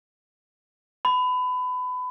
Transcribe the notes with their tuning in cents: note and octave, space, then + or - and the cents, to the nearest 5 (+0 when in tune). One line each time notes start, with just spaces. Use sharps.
B5 +25